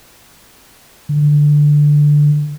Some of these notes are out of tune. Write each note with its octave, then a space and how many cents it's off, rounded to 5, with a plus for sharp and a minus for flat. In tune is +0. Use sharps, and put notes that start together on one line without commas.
D3 +5